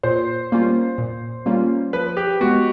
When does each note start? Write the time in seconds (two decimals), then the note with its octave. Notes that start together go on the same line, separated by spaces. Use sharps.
0.03 A#2 C5
0.52 G3 A#3 C#4 F4
0.98 A#2
1.46 G3 A#3 C#4 F4
1.93 F3 B4
2.17 G4
2.41 B3 F#4
2.43 G#3